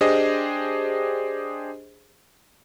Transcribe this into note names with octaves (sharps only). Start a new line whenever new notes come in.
D4 G4 G#4 C5 D#5